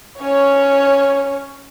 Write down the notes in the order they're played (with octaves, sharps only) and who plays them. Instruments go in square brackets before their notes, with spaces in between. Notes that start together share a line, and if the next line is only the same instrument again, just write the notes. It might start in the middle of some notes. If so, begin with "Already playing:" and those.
[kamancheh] C#4 C#5